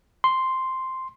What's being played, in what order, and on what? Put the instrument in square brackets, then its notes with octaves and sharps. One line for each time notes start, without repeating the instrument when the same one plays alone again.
[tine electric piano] C6